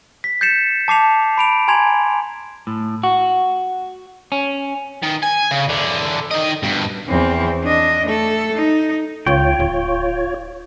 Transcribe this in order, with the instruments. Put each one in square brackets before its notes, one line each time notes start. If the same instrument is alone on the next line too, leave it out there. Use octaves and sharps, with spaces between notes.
[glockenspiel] B6
G6 A6 C7 C#7 E7
A5 D6 C7 F7
B5 D7 F7
G#5 A#5 C6 G#6 F7
[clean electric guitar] A2
F#4
C#4
[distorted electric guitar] D#3
G#5
C#3
E2 D3
D#3 D#5
G2 B2
[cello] E2 C4
D4 D#5
A3 A4
D#4
[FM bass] C#2 [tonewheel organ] F4 C#5 [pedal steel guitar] G5
[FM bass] D1